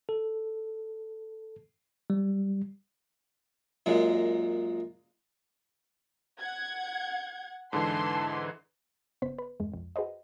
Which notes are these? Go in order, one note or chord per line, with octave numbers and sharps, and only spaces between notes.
A4
G3
F#2 A#2 G#3
F#5 G#6
G#2 D3 E3 A5 C6
G1 C#3 B3 C5 B6
B4
E2 G2 G#3
B1 F2
F#4 G#4 B4 C5 D#5